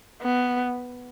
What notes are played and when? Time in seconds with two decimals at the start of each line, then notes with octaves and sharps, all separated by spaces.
0.22 B3